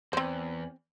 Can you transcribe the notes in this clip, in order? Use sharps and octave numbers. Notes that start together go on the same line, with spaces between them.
E2 C4 C5